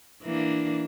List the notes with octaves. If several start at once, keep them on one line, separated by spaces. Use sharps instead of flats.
E3 A#3 D4